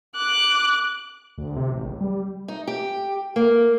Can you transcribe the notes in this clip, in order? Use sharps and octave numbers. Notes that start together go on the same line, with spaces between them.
D6 F#6
D2
C3
A1
C#2
G3
D#4
G4
A#3